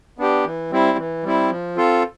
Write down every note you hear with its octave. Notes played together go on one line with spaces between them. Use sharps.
B3 D4 G4
E3
G3 C4 E4
E3
G3 C4 E4
F3
C4 F4 A4